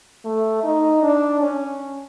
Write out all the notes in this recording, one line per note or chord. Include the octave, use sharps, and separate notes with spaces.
A3
D#4
D4
C#4